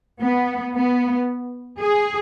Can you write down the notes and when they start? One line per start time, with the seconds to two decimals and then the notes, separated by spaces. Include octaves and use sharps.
0.22 B3
0.75 B3
1.81 G#4